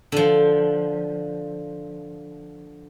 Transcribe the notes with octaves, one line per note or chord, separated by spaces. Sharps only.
D3 F3